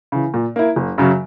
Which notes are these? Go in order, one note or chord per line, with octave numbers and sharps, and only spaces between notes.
C#3 E3
A#2
A#3 E4
F#1
F#2 C#3 F#3